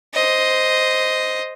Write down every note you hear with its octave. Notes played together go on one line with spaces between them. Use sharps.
C5 D#5